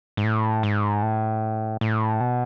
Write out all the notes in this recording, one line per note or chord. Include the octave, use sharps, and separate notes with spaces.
G#2
A2
G#2
A2
A2
B2